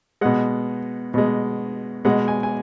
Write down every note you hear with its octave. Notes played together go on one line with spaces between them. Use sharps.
B2 G#3 F#5
B2 G#3
B2 G#3 F#5
G#5
G#5